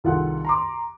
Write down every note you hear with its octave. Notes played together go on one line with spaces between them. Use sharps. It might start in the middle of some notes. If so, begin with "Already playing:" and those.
C2 D#3 F4 G#4 A4 F#5
A#5 C6 D6